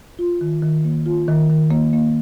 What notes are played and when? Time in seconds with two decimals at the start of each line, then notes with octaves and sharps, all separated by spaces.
0.19 F4
0.41 D#3
0.62 D#3
0.85 A#3
1.06 F4
1.28 D#3
1.50 D#3
1.71 A#3
1.93 A#3